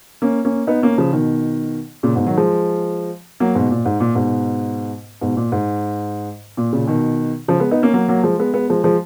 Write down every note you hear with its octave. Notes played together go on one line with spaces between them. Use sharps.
A#3 C#4
A#3 C#4
B3 D#4
A#3 C#4
C#3 F3
B2 D#3
A#2 C#3
G#2 B2
D#3 F#3
F3 G#3
F#3 A#3
G#2 B2
A#2
G#2
A#2
G#2 B2
G#2 B2
A#2
G#2
A#2
A#2 C#3
B2 D#3
C#3 F3
G#3 B3
B3 D#4
A#3 C#4
F#3 A#3
F#3 A#3
F3 G#3
G#3 B3
G#3 B3
F3 G#3
F3 G#3